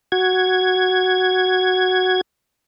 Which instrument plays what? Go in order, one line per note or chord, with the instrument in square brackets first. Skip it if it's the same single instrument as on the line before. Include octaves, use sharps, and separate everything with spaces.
[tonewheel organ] F#4 G#6